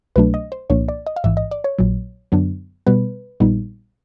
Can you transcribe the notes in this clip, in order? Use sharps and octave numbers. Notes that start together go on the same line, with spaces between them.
C2 B2 F#3 A3 D4 B4
D#5
C5
C2 A#2 F3 A#3 D4 C#5
D5
D#5
F5
A1 G#2 E3 E5
D#5
D5
C#5
A#1 A#2 F#3
F#2 D3 F#3 B3 D4
B2 G3 B3 B4
A#1 A#2 G3 B3 D#4